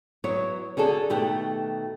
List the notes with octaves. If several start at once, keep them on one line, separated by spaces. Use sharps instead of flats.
F#3 B3 E4 C#5
D3 F#4 G#4 A4
B2 D#3 A3 G4 F#5